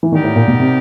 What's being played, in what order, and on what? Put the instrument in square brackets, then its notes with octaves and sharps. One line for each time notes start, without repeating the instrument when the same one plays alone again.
[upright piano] E3
[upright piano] D#3 [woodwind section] G3 B3 D#4 G4 A#4
[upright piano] A2
A#2
B2
C3